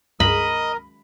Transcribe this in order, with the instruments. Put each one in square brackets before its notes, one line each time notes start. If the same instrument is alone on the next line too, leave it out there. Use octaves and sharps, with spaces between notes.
[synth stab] C#2 G2 [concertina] A#4 [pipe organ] D#5 [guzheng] B5